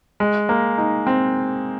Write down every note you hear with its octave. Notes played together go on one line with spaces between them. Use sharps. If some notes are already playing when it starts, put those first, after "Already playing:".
G#3
A#3
D#4
C4